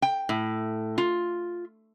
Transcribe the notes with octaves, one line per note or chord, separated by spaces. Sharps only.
G5
A2
F4